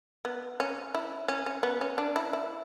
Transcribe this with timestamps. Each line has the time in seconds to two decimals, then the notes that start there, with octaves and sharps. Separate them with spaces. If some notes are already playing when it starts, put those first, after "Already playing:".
0.25 B3
0.60 C#4
0.94 E4
1.28 C#4
1.46 C#4
1.63 B3
1.81 C#4
1.98 D4
2.16 E4
2.33 E4